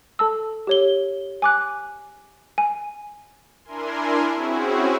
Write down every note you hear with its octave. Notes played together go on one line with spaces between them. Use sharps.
A4 A5 E6
G4 C#5 G7
G#5 D6 F#6
G#5
D4 E4 A#4 G#5 C6
C4 C#4 E4 F#4 G#4